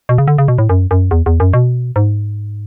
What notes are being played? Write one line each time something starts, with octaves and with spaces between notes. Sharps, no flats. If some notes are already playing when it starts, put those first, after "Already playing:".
B2
C#3
D3
C#3
B2
A2
F#2
F#2
E2
E2
F#2
B2
G#2